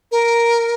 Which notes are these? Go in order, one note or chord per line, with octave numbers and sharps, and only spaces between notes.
A#4